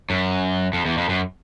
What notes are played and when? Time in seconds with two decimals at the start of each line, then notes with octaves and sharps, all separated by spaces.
0.10 F#2
0.73 F2
0.85 E2
0.98 F2
1.09 F#2